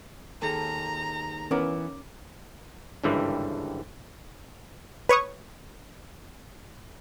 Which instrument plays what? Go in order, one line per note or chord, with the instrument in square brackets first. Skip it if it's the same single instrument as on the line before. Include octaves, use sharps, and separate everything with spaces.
[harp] D#2 G#4 A4 [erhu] A#5
[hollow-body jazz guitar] E3 B3 [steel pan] C#4 A#4 [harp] D6
[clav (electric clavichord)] G#1 C#2 G2 D3 E3 G3
[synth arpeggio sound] B4 C#5 C#6 D#6